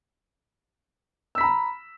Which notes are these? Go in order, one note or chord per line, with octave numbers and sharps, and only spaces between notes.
A#5 B5 E6 B6